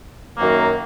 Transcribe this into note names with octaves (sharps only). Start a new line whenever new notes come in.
F#2 D#3 F#3 A#3